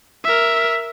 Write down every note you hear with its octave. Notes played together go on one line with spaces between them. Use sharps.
A#4 E5